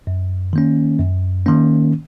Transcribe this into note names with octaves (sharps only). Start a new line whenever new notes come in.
F#2
D#3 A#3 C#4
F#2
D#3 A#3 C#4